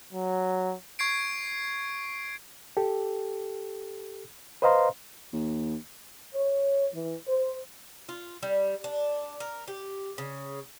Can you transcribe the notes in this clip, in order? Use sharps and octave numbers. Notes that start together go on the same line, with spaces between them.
F#3
C#6 G#6 C7 D7
G4 A4
B4 C5 D#5 F5 A#5 C6
D#2
C#5
E3
C5
F4
G3
D4
A#4
G4
C#3